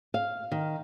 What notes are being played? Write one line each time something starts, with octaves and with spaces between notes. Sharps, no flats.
F5
D#3